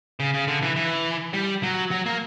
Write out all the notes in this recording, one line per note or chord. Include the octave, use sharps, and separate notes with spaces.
C#3
C#3
D3
E3
E3
G3
F#3
F#3
A#3